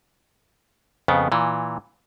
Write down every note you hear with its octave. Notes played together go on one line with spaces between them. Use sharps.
F2 C#3 B3
A#2 E3